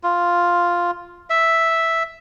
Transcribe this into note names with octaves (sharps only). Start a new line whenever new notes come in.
F4
E5